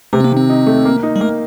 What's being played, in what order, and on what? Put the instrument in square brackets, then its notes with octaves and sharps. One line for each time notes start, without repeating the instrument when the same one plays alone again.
[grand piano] C3 [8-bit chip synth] A3
[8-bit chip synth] C4
A#3
[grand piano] D#3
[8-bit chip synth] C4
[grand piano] D#4
A3
A#3
D#4
[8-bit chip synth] G3
[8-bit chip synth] A3 [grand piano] A#3